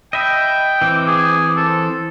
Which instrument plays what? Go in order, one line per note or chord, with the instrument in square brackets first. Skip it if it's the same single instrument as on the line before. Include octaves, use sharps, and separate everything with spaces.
[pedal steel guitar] D#5 E5 [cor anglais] G5 [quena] B5
[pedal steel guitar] E3 C4 [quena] D6
[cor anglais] G#4
[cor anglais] A4 [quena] C6